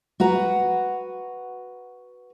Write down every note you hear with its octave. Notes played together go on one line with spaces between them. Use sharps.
F#4 B4 F#5 A#5